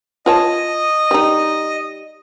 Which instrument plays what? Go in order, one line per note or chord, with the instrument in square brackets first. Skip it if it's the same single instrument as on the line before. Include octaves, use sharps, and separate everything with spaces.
[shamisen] F4 C#5 A5 [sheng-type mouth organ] D#5
[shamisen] G3 D#4